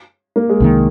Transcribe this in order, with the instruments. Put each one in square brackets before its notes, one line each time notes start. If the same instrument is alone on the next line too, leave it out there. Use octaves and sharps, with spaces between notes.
[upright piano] A#3
G#3
[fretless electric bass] C2 C3 D#3 A#3